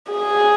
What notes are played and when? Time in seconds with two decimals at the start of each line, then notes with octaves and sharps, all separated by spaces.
0.12 G#4